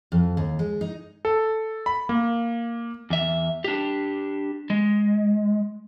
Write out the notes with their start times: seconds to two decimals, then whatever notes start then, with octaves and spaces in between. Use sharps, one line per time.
0.12 F2
0.37 D#2
0.59 G#3
0.81 D#4
1.25 A4
1.86 B5
2.09 A#3
3.10 E2 E5
3.64 D4 G4
4.70 G#3